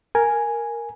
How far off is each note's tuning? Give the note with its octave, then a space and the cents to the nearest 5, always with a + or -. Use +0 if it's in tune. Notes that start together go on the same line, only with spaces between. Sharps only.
A#4 +0 G#5 +0